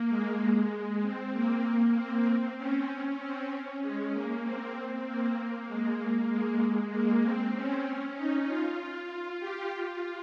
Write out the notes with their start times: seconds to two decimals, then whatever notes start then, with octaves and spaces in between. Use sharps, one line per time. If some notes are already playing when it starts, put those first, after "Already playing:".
Already playing: A#3
0.09 G#3
1.02 C4
1.33 A#3
1.95 C4
2.57 C#4
3.19 C4
3.50 C#4
3.82 G#3
4.12 A#3
4.43 C4
5.05 A#3
5.67 G#3
5.99 A#3
6.29 G#3
6.91 A#3
7.23 C4
7.54 C#4
8.16 D#4
8.46 F4
9.40 G4
9.72 F4